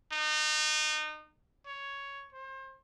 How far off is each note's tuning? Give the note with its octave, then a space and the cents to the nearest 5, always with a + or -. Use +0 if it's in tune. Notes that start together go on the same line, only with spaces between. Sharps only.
D#4 -30
C#5 +5
C5 +35